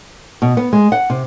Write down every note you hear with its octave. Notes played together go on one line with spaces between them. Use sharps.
B2
B3
G#3
F#5
C3